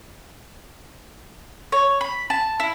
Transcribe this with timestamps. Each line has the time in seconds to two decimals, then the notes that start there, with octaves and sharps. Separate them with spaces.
1.72 C#5
2.01 B5
2.30 A5
2.60 E4